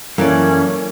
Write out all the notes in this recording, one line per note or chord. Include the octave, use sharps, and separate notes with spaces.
F#2 E3 A#3 C#4 A4 D5